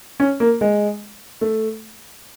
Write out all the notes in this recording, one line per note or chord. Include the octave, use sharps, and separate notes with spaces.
C#4
A#3
G#3
A3